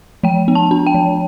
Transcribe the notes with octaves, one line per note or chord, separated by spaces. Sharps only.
F3 G5
B3
A5
D4
G5
F3